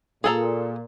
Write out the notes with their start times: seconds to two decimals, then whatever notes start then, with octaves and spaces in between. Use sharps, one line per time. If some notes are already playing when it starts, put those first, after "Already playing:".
0.24 A#2 G#4 A4 A#5